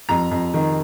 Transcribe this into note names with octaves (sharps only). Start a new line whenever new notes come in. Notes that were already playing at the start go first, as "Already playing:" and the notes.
F2 A#5
F2
D#3